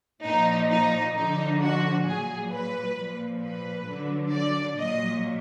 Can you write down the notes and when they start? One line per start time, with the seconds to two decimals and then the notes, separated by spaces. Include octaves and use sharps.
0.23 A#2 F3 D#4
0.69 D#4
1.14 D3 F3 D#4
1.60 F#4
2.05 A#2 F#3 G#4
2.50 B4
2.96 A#2 F3
3.41 B4
3.85 D3 F#3
4.31 D5
4.77 A#2 F#3 D#5